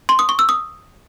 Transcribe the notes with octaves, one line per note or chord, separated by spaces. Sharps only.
C6
D#6
C#6
E6
D#6